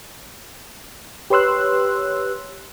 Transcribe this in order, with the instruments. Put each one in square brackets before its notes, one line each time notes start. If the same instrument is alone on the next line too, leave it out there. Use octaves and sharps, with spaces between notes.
[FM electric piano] G4 B4 C#5 C6 E6 F#6